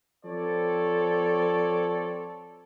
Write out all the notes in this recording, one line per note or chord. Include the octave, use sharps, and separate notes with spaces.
F3 C4 A4 C#5 D5